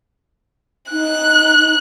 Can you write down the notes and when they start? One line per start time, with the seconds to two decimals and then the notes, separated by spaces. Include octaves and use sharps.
0.92 D#4 F#6